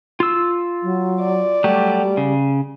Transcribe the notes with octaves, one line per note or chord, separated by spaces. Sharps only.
F4 E6
F#3
D5
F#3 G3 A3 G4
C#3